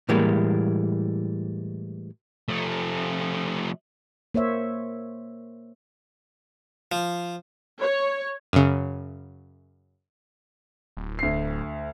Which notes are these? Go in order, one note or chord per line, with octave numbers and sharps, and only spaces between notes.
A2 E3 G3 G#3 A#3
F3 A3
A#3 C5 C#5 E5
F3
C#5
F#2 C#3
D1
D2 C7